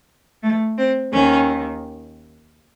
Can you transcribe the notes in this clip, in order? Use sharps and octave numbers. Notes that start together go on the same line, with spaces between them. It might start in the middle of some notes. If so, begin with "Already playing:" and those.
A3
C4
D#2 D#3 C#4